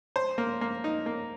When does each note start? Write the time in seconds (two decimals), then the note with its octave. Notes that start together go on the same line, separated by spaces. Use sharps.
0.16 C5
0.38 A#3
0.61 A#3
0.84 D#4
1.06 A#3